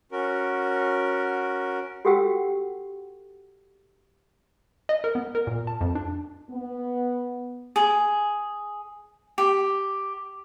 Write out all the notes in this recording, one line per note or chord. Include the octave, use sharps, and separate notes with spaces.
C#4 F#4 A#4
F#4 G4 A4 F#5 G5 E6
D#5
A#4
B3
A#4
A#2
A5
F2
D4
B3
G#4
G4